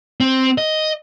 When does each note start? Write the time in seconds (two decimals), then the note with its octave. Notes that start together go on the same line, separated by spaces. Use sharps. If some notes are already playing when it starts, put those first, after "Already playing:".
0.20 C4
0.58 D#5